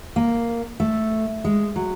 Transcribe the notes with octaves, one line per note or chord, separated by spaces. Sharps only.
A#3
A3
G#3
F#3